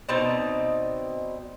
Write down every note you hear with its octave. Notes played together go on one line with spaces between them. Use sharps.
B2 C4 D#4 D5